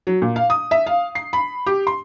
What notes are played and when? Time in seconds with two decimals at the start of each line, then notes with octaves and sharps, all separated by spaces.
0.07 F#3
0.22 A#2
0.36 F5
0.50 D#6
0.71 E5
0.86 F5
1.15 C7
1.33 B5
1.66 G4
1.87 C6